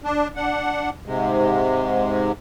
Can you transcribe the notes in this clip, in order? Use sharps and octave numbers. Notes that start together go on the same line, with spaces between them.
D4
D4 F#5
G#2 C3 G#3